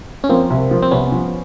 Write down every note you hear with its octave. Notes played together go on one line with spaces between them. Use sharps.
C#4
F3 A#3 C4
C2
F3
C4
C2 B3 C#4
F3